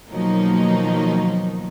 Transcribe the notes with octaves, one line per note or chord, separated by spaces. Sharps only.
B2 D#3 F3 F#3 A#3 D#4